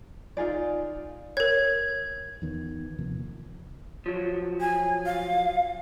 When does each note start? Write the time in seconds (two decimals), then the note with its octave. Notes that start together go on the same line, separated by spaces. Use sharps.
0.37 D#4 F4 G#4 D5
1.37 A#4 C#5 G#6
2.42 E2 D#3 B3
2.99 D#2 C3 F3 A#3
4.06 F3 F#3
4.61 G#5
5.06 F5